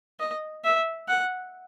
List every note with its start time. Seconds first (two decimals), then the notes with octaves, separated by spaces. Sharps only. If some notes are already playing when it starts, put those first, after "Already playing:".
0.20 D#5
0.65 E5
1.08 F#5